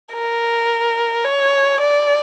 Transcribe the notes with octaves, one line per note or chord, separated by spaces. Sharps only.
A#4
C#5
D5